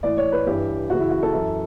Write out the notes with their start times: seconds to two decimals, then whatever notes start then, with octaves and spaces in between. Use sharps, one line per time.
0.03 A2 E3 D5
0.18 C#5
0.32 B4
0.46 G2 E3 G4
0.89 F#2 C#3 E3 F#4
1.00 E4
1.11 F#4
1.23 A4
1.33 F#2 E3